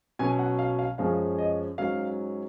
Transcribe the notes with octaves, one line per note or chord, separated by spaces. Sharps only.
B2 F#3 C#4 G#5
F#5
F5
F5
F#2 F3 G#3 C#4 F5
D#5
G#2 F#3 C#4 F5